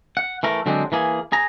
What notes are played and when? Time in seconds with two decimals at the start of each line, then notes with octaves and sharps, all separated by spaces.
0.17 F#5
0.43 E3 A3 A#4
0.66 D3 F#3 G#3 C4 D4
0.92 E3 A#3 G#4
1.32 G#4 A#5